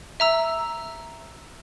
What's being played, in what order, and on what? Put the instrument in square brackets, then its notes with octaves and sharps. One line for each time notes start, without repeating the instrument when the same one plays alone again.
[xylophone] E5 A#5 E6